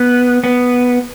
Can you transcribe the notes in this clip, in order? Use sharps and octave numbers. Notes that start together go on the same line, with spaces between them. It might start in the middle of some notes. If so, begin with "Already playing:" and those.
Already playing: B3
B3